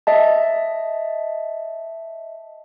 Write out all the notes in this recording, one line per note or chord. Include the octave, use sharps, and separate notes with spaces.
D#5 E5 A5